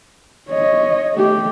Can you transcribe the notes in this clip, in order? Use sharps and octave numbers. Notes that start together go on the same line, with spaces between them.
C#5 D#5
A3 G4